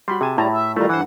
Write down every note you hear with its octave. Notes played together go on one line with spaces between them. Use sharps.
G3 F#4 B5 C6
C3 G4 G#4 G#5 A5
A2 G3 E4 A5 A#5
E5
D#3 G3 A3 E4 F4 A4 A#5
G2 E3 C5 F#5